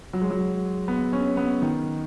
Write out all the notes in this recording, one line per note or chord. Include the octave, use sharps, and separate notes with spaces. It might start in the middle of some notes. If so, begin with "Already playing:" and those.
F#3
G#3
F#3
B3
C#4
B3
D#3